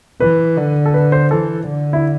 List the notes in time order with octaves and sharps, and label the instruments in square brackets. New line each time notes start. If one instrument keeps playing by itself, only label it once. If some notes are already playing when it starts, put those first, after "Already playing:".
[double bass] E3 [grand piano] B4
[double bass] D3
[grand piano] A4
B4
C5
[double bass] E3 [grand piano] A4
[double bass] D3
[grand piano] E4